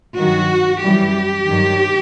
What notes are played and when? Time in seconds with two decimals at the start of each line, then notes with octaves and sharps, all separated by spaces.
0.17 G2 D#3 F#3 F#4
0.83 F#2 E3 G3 G4
1.48 G2 D#3 F#3